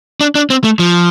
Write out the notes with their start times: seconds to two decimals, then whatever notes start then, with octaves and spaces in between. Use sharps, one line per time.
0.21 D4
0.35 D4
0.50 C4
0.64 A3
0.79 F3